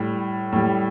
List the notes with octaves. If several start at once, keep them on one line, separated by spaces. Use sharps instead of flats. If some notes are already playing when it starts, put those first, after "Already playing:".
Already playing: A2 G3
A2 G3